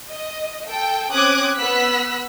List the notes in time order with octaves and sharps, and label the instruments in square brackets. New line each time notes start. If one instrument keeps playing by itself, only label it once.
[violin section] D#5
A4 G5
C4 C#4 D6 D#6 F#6 G#6
B3 E6 F#6 B6